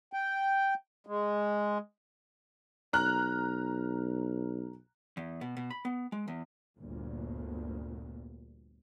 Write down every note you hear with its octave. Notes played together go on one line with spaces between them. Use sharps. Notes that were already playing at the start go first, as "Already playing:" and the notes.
G5
G#3
B1 A#5 F6 F#6
E2
B2
B2
B5
B3
G#3
E2
G1 D2 A#2